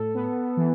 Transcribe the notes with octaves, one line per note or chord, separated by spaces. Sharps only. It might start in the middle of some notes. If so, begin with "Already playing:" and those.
Already playing: A2 A4
B3
E3